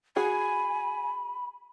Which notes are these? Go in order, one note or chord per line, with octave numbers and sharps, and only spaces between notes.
F#4 G#4 G#5 B5